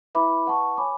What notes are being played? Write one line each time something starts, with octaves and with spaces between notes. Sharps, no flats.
E4 B4 E5 B5 D6
B4 F#5 A5 C#6
C#5 G#5 B5 D6